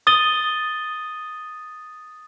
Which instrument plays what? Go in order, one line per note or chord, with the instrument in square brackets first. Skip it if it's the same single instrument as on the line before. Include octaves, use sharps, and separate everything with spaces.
[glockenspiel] D#6 A6 D#7 G7